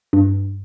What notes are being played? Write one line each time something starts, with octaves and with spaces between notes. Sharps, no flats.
G2